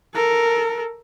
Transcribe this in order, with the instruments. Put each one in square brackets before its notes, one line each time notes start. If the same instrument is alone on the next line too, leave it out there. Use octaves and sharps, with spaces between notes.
[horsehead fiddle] A4 A#4